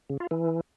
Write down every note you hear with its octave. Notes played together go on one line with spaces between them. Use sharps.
C#3
F4
E3